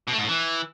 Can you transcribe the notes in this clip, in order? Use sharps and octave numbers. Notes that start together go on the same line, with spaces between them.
B2
A3
G#2
A2
E3